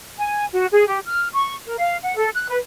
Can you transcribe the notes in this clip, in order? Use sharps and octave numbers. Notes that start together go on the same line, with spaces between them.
G#5
F#4
G#4
G4
F6
C#6
A#4
F5
F#5
A4
F#6
B4